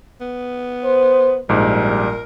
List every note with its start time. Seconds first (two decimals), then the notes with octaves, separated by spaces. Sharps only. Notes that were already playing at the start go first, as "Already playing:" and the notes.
0.21 B3
0.84 C5
1.49 A#1 G#2 G3 A#4